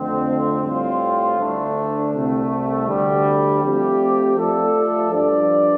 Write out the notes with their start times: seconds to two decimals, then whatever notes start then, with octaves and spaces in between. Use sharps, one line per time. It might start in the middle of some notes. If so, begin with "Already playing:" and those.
Already playing: F2 D3 F3 A3 C4
0.63 A2 G3 C4 F4
1.38 D2 D3 A3 D4
2.13 C2 C3 A3
2.87 D2 D3 G3
3.61 F3 A3 C4 G4 D5
4.36 F3 A3 F4 A4 D5
5.11 G2 F3 D4 G4 D5